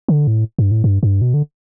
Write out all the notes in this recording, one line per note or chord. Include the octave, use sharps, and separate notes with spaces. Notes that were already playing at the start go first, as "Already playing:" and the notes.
D3
A2
G2
A2
G2
G2
B2
D3